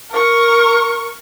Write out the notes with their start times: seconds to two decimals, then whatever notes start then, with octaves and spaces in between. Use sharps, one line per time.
0.11 A#4 C#6